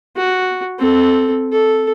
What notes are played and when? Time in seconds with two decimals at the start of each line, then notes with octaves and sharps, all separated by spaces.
0.17 F#4
0.79 C4 A4
1.52 A4